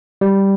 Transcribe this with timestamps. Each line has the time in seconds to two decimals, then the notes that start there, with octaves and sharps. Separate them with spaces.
0.21 G3